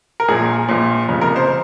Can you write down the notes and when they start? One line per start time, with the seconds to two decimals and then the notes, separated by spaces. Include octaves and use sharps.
0.20 A#4
0.28 A#1 A#2 G#4
0.68 A#1 A#2
1.08 F1 F2 C#3
1.21 A#4
1.36 C5